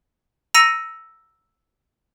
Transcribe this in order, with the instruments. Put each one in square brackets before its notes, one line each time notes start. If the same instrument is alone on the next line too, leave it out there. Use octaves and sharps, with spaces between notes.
[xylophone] A#5 E6 A#6 C#7 D#7